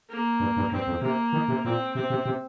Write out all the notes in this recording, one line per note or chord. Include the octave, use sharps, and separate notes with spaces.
A#3
G2
G2
G2 C4
F2
C3 A#3
D#3
C3
A#2 C4
C3 C4
C3
C3